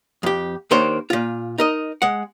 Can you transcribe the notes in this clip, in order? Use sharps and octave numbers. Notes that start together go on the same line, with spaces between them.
F2 G4
D#2 D#3 A#3 D4 C5 C#5
A#2 F4
D#4 A#4 D#5
G#3 F#5